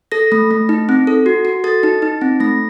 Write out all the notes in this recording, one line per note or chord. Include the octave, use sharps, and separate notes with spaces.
A4 A#6
A3
A3
D#4
C4
A4
F#4
F#4
A4 A6
D#4
D#4
C4
A3 A#6